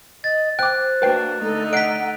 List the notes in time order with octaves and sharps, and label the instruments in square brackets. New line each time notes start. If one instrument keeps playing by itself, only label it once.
[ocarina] D#5 [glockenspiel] A6
[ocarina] C5 [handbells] G5 D6 [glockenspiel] F#6
[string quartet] A#3 D4 F#4 [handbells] B4 G5 C7
[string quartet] D3 A3 D#4 [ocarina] A4
[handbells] D#5 F#6 C7 [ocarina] F#5 [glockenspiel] B6 D7